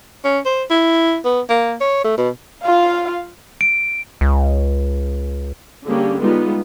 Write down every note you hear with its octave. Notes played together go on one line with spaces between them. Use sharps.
C#4
C5
E4
B3
A#3
C#5
A3
B2
F4 F5
D7
C#2
D3 G3 A#3 C#4 G4 G#4
G3 G#3 B3 D#4 F4